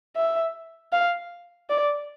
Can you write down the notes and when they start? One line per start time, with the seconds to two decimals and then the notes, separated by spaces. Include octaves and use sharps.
0.16 E5
0.92 F5
1.70 D5